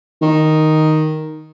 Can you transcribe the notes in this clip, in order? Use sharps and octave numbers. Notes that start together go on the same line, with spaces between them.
D#3